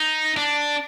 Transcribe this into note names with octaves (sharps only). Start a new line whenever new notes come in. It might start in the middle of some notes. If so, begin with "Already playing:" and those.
Already playing: D#4
D4